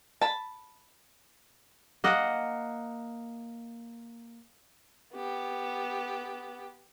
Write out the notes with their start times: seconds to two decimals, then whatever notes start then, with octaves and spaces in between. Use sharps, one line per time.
0.21 A5 B5
2.04 A#3 D#5 F#5
5.14 B3 G4